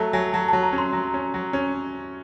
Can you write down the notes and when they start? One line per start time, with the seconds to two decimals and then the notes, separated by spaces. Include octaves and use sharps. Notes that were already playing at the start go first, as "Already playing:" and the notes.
Already playing: F#3 A3 A5
0.13 F#3 G#5
0.33 F#3 A5
0.48 A5
0.53 F#3
0.63 A#5
0.73 C#4
0.78 C6
0.93 F#3
1.14 C#4
1.34 F#3
1.53 C#4